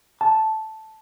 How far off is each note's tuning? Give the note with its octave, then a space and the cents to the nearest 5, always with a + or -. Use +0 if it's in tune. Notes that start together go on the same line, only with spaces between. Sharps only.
A5 -5